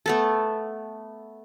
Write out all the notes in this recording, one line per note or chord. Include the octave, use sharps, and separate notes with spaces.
A3 B3 A4